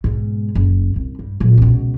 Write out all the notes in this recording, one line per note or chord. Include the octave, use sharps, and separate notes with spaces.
G#2 B2
F#1
C2
G2
A#2 F#3
C#2 B2